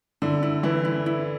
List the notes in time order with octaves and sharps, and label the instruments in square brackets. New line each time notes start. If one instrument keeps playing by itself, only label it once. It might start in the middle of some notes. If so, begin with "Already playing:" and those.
[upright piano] D3 [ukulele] E4
[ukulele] E4
[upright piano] E3 [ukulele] E4
[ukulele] E4
E4